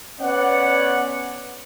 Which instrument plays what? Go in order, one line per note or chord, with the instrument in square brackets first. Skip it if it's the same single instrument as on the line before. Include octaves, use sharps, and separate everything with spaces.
[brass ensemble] B3 C#4 C#5 D5 F#5